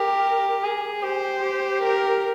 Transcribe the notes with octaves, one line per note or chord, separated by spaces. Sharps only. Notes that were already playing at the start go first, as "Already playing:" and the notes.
Already playing: G4 A#4
G#4
G4 C5
G4
A#4